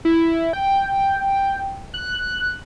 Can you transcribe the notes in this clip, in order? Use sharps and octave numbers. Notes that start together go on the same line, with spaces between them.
E4
G5
F#6